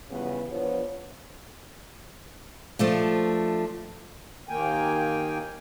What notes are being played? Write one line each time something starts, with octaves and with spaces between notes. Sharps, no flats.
C#3 E3 F3 G3 B3
F3 B3 D4 F4 C#5
F3 A3 D4
D#2 D#3 A#3 G5 G#5